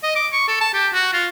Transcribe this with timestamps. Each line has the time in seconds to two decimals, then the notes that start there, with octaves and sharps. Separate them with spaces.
0.03 D#5
0.16 D6
0.33 C#6
0.48 A4
0.61 A5
0.74 G4
0.93 F#4
1.13 F4